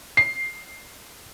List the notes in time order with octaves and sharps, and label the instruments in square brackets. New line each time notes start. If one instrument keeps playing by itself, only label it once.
[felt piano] C7